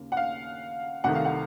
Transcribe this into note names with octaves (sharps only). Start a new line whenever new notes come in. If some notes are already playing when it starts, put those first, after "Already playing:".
Already playing: D#2 C#3 A#3
F#5
F5
C2 C3 D#3 A3 F#5
F5
F#5